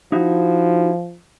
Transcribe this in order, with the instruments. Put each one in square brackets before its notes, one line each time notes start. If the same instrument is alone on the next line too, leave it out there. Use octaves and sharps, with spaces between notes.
[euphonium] F3 [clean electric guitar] D#4 E4 F#4